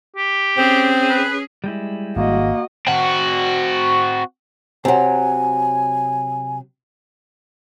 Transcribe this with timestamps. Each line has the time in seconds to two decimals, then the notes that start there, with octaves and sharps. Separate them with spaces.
0.16 G4
0.57 C4 C#4 G#4
1.10 B4
1.64 G3 G#3 E4
2.16 G#1 A#3 F#4 D#5
2.87 C4 F#4
4.85 C3 F#3 G#5